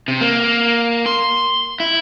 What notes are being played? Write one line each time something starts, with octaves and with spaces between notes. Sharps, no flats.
C3
A#3
C6
E4